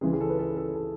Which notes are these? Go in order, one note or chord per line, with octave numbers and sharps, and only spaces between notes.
C#2 C#3 E3 G#3 G#4
G#4
A4
B4
A4
A4
A4